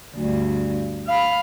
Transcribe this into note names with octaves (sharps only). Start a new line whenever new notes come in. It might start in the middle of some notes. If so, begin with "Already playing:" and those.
D2 G2
F5 B5 F6